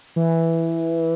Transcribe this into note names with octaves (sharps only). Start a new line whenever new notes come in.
E3